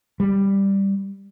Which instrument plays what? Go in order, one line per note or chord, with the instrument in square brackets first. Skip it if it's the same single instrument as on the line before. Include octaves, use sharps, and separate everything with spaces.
[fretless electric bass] G3